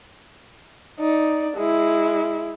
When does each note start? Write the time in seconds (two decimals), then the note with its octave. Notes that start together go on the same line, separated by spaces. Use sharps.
1.00 D#4 D5
1.57 G#3 E4